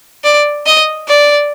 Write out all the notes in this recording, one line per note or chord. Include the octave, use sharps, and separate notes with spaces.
D5
D#5
D5